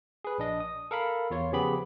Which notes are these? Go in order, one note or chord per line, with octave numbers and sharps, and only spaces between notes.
G#4 B4
A#1 D4 D#5
D#6
A4 A#4 F5 B5
E2 F4 C#5
C#3 F3 B3 G4 G#4 B5